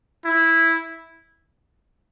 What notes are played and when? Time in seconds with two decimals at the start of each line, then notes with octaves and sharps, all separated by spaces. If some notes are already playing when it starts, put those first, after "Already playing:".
0.25 E4